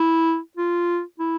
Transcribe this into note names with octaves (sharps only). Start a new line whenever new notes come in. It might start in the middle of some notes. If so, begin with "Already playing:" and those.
Already playing: E4
F4
E4